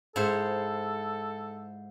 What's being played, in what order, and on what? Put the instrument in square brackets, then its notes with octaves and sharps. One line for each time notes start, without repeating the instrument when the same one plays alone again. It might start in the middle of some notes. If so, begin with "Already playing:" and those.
[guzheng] G#2 E4 C5 [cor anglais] A4